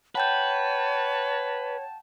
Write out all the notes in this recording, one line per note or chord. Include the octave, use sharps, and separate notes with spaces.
B4 C#5 F#5 G5 A5 G6